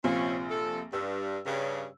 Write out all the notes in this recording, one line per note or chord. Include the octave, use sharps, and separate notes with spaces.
A#1 C3 C4 C#4 F4
A4
G2 E6
G2 C#3